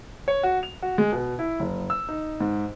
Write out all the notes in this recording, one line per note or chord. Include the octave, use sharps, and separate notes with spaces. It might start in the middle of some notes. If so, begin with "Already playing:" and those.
C#5
F#4
F7
F#4
G#3
B2
E4
F#1
E6
D#4
G#2